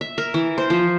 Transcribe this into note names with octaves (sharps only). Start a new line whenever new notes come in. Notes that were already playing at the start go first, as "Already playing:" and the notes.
E5
A#4
E3
C5
F3